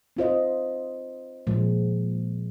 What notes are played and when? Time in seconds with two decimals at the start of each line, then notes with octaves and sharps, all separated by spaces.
0.17 C4 F4 C5 D#5
1.47 A#2 F3 G#3